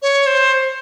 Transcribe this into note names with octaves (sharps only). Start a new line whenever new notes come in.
C#5
C5